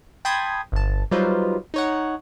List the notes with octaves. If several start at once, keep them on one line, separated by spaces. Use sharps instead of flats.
G5 A5 B5 C6 D#6 G#6
G1 A5
F#3 G3 D#4 F4 B4 C5
D#4 C#5 F#5